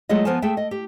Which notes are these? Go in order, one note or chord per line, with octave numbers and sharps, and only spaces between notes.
F#3 G#3 A3 F4 G#4 D#5
F3 B3 A#4 C5 G#5 A5
A3 G#4 E5 G5 A5
D#5
G4